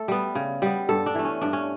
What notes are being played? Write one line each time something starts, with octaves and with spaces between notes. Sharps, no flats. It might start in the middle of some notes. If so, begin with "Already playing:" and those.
Already playing: A3 A4
G3 B3
C#3
G3 B3
G2 A4
D4
E3 A3
C#4
G2 D4
C#4